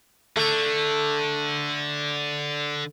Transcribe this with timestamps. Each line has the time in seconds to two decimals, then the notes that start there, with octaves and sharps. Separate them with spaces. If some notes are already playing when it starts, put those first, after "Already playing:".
0.37 D3 A3